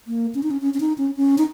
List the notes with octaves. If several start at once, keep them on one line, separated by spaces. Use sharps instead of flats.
A#3
C#4
D#4
C#4
C#4
C#4
D#4
C#4
C#4
D#4